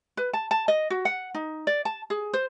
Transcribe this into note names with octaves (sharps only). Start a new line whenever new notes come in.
B4
A5
A5
D#5
F#4
F#5
D#4
D5
A5
G#4
C5